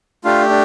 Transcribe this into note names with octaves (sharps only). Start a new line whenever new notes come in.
A3 D4 F4 G4 F5
D4